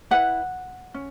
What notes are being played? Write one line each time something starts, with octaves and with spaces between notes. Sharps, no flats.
E4 B4 F#5
C#4